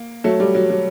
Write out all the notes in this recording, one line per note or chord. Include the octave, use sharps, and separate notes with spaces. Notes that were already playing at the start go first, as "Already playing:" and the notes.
Already playing: A#3
F#3 A3
G3
F#3
F#3